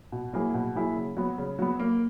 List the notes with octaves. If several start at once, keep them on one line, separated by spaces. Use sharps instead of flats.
B2
F#3 A#3 E4 G#4
B2
F#3 A#3 E4 G#4
C#3
F#3 B3
C#3
F#3 B3
A#3